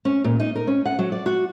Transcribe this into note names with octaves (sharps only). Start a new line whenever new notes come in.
C#4
A#2
D#4
A#4
C#4
F#5
F#3
D5
F#4